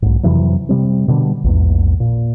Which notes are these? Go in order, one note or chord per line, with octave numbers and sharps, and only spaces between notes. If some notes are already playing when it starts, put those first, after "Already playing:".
B1 G#2
F2 C3 E3 F#3
C3 G3 C4
B2 D3 G3
A#1 E2 G#2
A#2